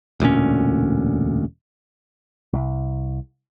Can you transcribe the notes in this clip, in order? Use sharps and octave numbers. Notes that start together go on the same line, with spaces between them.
E1 D2 A#2 C#4
C2